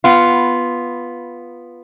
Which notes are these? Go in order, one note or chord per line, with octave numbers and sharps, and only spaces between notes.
B3 F4